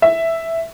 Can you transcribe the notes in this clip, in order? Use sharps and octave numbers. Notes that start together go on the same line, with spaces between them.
E5